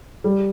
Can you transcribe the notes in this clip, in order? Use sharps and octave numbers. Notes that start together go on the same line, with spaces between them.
G3